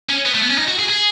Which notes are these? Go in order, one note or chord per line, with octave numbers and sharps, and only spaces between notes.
C#4
B3
A3
B3
C#4
D#4
F#4
G#4
G#4